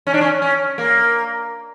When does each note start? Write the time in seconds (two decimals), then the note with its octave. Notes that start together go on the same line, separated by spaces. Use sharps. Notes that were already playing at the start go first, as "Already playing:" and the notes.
0.07 C#4
0.14 D4
0.21 C#4
0.42 C#4
0.78 A#3